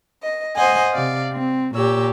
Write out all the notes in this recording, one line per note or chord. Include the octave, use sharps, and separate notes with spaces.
D#5
C5 D#5 F#5 G#5
C3 D5 F5
C4
A#2 G4 C#5 E6